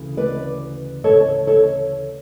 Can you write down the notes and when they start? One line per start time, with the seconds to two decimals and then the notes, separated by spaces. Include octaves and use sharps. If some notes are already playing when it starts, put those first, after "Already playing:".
Already playing: D2 C#3 E3
0.17 B4 D5
1.04 A4 C#5
1.47 A4 C#5